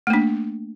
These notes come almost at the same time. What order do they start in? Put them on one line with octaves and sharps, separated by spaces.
A3 A#3 D4